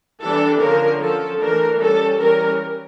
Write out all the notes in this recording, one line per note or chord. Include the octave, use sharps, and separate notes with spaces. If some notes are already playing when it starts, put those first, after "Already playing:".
E3 G3 D4 A4
D3 F3 C#4 A#4
F3 C#4 A4
E3 A3 D4 A#4
G3 C#4 A4
E3 G3 C#4 A#4